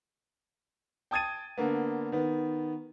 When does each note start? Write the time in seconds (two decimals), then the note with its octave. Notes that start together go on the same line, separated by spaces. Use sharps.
1.11 G5 A5 D#6 G#6 A6 D#7
1.58 D3 A#3 B3
2.12 D#3 B3